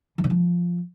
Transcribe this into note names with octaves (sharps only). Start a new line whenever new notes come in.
E3
D3
F3